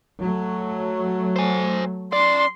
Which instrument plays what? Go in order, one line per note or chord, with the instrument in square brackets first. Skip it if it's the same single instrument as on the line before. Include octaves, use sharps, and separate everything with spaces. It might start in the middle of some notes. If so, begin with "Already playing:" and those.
[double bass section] F#3 A3
[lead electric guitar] C5 G#5
[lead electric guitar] C#4 D5 [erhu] C6